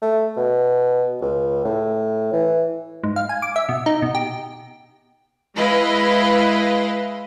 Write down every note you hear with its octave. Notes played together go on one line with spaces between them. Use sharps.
A3
B2
C#2
A2
E3
G#2
F5
G#5
D6
E5
B2
D#4
B2
G4
G#3 E4 B4 D#5 F5